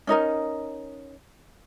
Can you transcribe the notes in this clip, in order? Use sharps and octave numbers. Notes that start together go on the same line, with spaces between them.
C#4 D#4 A#4 D#5